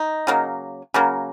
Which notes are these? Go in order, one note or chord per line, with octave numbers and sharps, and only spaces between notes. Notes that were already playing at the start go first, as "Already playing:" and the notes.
Already playing: D#4
C#3 F#3 A#3
C#3 F#3 A#3